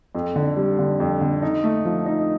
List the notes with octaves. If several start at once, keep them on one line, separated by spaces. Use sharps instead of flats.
F2
D3
G3
D3
F2
D3
D#4
A3
F3
D#4